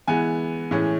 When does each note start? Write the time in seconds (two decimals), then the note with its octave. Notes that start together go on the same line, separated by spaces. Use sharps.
0.08 E3 G#3 B3 G#5
0.71 A2 E3 G#3 C#4